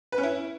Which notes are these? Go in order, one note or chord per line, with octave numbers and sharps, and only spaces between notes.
B4
C#4
E4